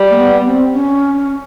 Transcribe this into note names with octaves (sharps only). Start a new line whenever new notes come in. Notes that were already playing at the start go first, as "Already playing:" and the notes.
Already playing: G3
A#3
B3
C4
C#4